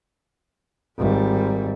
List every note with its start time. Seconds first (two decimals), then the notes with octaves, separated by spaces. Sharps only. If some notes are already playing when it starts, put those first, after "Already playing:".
0.98 G#1 G3